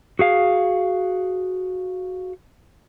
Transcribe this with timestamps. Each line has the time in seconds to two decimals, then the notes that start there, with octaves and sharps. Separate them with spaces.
0.19 F#4 G#4 F5